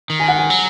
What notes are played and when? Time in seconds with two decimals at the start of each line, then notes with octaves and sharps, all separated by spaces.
0.10 D#3
0.20 G#5
0.28 F#5
0.39 G#5
0.50 F#3